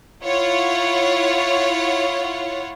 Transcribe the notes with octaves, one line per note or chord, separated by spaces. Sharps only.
E4 F4 C#5 F#5